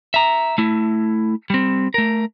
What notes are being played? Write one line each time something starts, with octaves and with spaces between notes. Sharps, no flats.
E5 A#5
A3 E4
G3 C4
A3 A#4